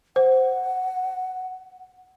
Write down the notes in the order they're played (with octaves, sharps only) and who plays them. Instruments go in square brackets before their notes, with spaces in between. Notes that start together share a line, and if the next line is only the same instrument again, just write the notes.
[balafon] C5 [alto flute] F#5